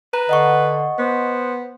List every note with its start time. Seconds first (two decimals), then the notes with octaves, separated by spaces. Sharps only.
0.13 B4 A#5
0.29 D3 D#5 F#5 C#6
0.99 B3 C5